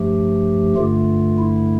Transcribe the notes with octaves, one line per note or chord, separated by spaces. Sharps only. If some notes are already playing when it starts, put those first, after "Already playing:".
Already playing: G2 F3 A3 G4
G2 D3 A3 F4
E4